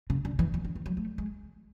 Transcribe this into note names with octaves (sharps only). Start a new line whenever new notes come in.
C#3
D3
E3
E3
D3
E3
F#3
A3
G#3